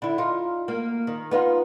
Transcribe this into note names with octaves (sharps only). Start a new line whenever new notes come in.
D3 E4
D#4 F4
A#3
D#3
B3 D#4 F4